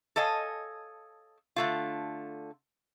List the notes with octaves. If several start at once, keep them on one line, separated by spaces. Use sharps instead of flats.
A4 C#5 D#5 F5 G#5
D3 A3 F4